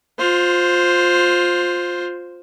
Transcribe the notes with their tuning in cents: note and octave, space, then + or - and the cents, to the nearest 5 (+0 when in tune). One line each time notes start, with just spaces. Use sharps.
F4 +15 C5 +0